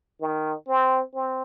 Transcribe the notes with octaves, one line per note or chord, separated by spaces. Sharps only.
D#3
C4
C4